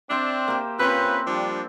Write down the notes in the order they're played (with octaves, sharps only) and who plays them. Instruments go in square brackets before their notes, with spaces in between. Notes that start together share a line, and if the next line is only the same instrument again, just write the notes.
[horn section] C4 D4 [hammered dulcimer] C5 E5
[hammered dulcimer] A#3 G4
[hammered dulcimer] C4 [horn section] C#4 F4 B4
[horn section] F3 G3 D4